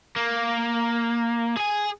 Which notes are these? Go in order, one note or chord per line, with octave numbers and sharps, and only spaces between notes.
A#3
G#4 G#5